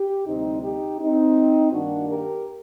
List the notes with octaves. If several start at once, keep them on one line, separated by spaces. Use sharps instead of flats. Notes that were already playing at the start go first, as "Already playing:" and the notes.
Already playing: G4
D2 C3 G3 C4 D#4
D#4 G4
C4 D#4
G2 D#3 G3 A#3 D4 F#4
G4 A#4